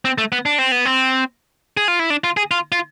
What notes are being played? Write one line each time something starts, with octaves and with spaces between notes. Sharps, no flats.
C4
A3
B3
D4
C4
B3
C4
G#4
F4
E4
D4
F4
G#4
F4
F4